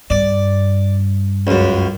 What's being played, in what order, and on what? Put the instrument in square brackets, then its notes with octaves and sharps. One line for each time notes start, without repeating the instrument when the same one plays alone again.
[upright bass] G2 [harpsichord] D5
[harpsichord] C#2 F#2